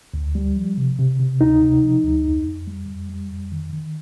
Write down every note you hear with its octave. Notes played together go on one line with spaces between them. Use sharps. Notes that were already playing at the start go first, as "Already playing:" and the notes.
D2
G3
F3
C3
C3
C3
D2 D#4
C3
F3
D2
F2
F2
G3
F2
G3
F2
D#3
D#3